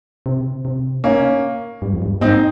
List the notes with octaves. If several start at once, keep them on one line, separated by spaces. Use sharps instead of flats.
C3
C3
A#3 C#4
G2
F2
G2
G#2 C4 D#4